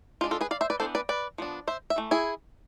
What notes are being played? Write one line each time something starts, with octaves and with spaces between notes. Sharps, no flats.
G#3 D4 F4
F4 A4
G#4 B4
D5 F5
C5 E5
B4 D5
E3 B3 D4 A4 C5
B4 D5
B4 D5
F3 B3 D4
C5 E5
E5
E3 A3
E4 G#4